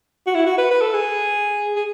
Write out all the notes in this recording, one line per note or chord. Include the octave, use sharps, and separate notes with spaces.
F#4
E4
F#4
B4
B4
A4
G#4
G#4